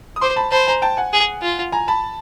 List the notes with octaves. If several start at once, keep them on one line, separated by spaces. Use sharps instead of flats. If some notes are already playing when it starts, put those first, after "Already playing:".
D#6
C5 C6 D6
A5 B5
C5 A5 B5
G#5 A#5
G5 A5
F#5 G#5
G#4
F4
G#5 A#5
A5 B5